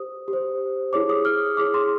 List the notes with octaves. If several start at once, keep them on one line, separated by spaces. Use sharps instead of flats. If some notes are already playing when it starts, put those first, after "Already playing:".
Already playing: G4 C5 D#6
G4
C5
E4 G#4 C#5 D6
D#6
F6
E4 G#4 C#5 D6
C6